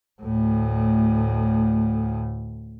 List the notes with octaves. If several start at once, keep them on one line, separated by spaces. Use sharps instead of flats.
D2 A2